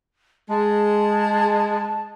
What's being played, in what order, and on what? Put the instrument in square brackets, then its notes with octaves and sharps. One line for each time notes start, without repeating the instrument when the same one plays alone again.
[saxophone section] G#3 [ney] A5